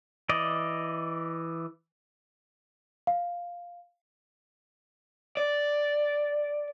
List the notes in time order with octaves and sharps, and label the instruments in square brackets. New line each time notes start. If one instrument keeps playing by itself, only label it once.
[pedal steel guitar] E3 D5 D#5
[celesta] F5
[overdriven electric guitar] D5